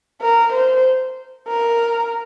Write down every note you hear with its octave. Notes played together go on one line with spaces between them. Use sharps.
A#4
C5
A#4